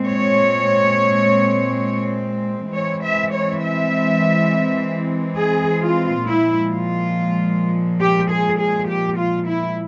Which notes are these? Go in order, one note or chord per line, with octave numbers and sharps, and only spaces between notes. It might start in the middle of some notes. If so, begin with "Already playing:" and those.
Already playing: A#2 G#3 C4
C#5
E3 G#3 C4 C#5
E5
C#5
E5
G#4
F4
A#2 F3 G#3 E4
F4
G4
G#4
G#4
G4
F4
E4